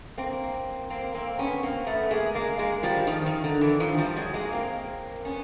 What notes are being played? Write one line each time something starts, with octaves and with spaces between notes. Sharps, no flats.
A#3 C4
A#3 C4
A#3 C4
B3 C#4
A#3 C4
A3 B3
G#3 A#3
G#3 A#3
G#3 A#3
F3 G3
D#3 F3
D#3
D3
D3 E3
D#3 F3
F3 G3
F#3 G#3
G#3 A#3
A#3 C4
B3 C#4